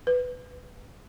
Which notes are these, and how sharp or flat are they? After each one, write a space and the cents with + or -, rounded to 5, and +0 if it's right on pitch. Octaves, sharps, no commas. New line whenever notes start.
B4 +15